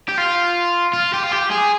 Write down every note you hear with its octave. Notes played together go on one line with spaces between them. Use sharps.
G4
F4
F4
G4
F4
G4
G#4